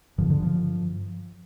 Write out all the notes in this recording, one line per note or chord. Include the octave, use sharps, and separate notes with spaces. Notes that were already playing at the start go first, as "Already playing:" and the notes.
G2 D3 F3
D3
F3